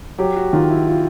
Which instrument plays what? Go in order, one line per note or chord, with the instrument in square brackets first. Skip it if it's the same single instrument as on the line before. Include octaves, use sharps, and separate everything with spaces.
[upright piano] F#3 [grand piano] G4
[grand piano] F#4
[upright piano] D#3 [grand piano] F4
[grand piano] E4
F4